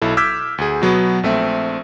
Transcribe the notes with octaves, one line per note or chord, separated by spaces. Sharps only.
B1 E4 A4
D6 E6 F6 G6 G#6 B6
D2 G#4
B2 F#3 B3
A#1 A3 C4 E5